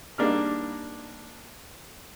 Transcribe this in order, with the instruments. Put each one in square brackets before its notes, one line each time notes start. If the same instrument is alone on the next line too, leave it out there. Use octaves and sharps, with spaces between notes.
[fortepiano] G3 A#3 D4 D#4 F6